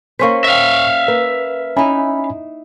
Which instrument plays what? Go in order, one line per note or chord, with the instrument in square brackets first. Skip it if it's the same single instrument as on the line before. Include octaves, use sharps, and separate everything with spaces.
[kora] A#3 C#4 C5 [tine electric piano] C#6 B6
[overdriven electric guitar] E5 F5
[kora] A#3 [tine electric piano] B4
[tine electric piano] C#4 G#5 B5 [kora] D#4 E4